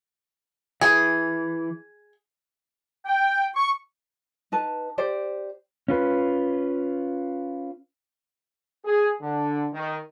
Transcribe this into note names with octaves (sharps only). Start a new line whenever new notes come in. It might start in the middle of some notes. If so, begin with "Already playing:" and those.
E3 G#4
G5
C#6
D#4 B4 A5
G4 C5 D5
C#4 F4 B4
G#4
D3
D#3